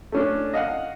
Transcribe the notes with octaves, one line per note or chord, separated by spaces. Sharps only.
A3 C#4 D4
D#5 F5 F#5